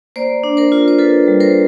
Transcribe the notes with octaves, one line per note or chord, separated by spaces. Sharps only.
A#3 C5 D5
D4
A#4 C5
F4
C5
F4 A4 B4
G3
A#4 C5